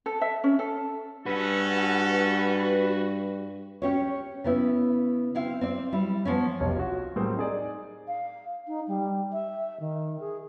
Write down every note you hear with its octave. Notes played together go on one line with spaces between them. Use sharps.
A4
E5
C#4
A4
G2 C#4 F#4 A4 B4
C#4 G4 C#5
C#3 B3 E4
C4 E4 F5
C4 D5
G3 E4
F3 B3 C#4
F1 B1 G4 C#5
F4 F#4
A2 G3 A#3 C4 G#4
D#4 G#4 D5
F5
D#4
G3
E5
D#3
G#4